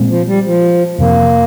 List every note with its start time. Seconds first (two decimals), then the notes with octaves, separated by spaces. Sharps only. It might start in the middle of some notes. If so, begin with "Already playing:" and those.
Already playing: A#2 G#3 C4
0.10 F3
0.27 G3
0.46 F3
0.98 F2 C3 F3 A#3